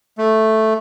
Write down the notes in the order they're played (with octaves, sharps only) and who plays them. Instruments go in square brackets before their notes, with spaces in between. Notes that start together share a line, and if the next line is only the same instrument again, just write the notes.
[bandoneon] A3